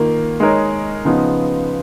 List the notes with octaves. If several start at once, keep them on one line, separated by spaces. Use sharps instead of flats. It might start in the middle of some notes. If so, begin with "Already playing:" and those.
Already playing: D#3 A#3 F4
G#3 D#4 A#4 C#5
C#3 F3 B3 D#4